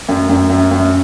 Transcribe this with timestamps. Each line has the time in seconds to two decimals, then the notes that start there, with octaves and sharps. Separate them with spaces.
0.09 F#2
0.29 F#2
0.50 F#2
0.71 F#2